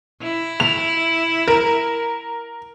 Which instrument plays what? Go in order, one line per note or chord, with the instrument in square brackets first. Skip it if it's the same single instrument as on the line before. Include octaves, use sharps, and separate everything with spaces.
[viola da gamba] E4
[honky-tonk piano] F7
A#4